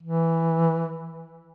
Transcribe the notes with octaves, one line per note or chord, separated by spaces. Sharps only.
E3